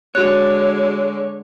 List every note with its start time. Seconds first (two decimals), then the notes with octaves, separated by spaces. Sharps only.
0.15 D3 G#3 F#4 C#5 F#6